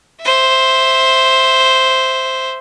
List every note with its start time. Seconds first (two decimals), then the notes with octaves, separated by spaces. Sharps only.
0.21 C5 E5